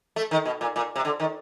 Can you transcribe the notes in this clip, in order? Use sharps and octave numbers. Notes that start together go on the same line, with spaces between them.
A3
D#3
B2
A#2
A#2
C3
D3
D#3